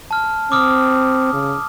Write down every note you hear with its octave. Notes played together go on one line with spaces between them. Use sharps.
A5 F6
C4 D6 D#6 F6
C#3